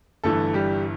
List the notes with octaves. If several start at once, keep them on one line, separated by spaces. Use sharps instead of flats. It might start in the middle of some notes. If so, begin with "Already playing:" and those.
G1 G2 E3 A3 A4
G3 G4